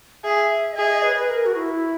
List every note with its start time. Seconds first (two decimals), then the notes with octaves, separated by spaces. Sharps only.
0.24 G#4 E5
0.72 D#5
0.77 G#4 E5
0.90 D#5
1.03 B4
1.16 B4
1.30 A#4
1.46 F#4
1.56 E4